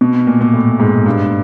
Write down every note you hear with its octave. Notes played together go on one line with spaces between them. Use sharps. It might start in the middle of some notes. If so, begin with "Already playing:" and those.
B2
A#2
A#2
A2
G#2
G2